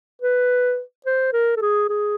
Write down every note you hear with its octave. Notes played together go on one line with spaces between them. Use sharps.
B4
C5
A#4
A4
G#4
G#4